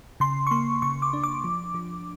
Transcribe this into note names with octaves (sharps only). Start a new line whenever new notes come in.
C#3 C6
C#6
A#3 C6
C#3 C#6
D6
D4
D6
F3
F3